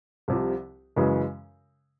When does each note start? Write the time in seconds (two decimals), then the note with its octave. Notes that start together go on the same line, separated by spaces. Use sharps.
0.28 C2 C3 F3
0.96 F#2 C#3 E3 G#3